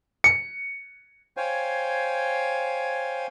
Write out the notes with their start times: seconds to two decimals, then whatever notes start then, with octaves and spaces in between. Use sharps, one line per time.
0.24 C#7
1.37 C5 C#5 F5 G5 G#5